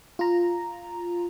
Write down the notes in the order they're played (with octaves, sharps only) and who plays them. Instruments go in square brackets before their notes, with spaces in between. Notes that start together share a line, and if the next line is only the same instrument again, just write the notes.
[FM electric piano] F4 A#5